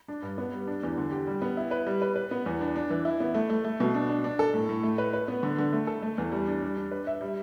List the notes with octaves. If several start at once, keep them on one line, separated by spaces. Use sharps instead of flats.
D4
G2
B3
G3
D4
E2
D3
G4
G3
B3
E4
B4
G3
B4
B4
B3
E2
D4
D4
E3
E4
B3
A3
A3
A3
B2
D4
D4
D4
A4
A2
A2
A3
B4
B4
B3
D3
D3
A3
A4
A3
E2
G3
D4
G3
D4
B4
E5
G3